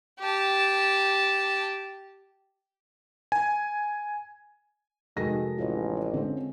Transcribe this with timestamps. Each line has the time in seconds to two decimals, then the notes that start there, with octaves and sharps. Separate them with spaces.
0.19 G4 A5
3.32 G#5
5.17 F1 D#3 G#3 F#4 G#4 A4 A#6
5.58 A1 F4 C#5 D#5
6.14 D3 C4 C#4